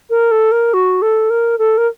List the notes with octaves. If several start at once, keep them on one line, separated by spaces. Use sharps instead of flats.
A#4
A4
A#4
F#4
A4
A#4
A4
A#4